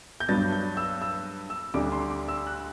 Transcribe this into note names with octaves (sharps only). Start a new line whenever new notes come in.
G6
G2 F#3 B3 D4 A6
G6
E6
E6
E6
D2 D3 G3 D4 D6
C6
D6
E6
F#6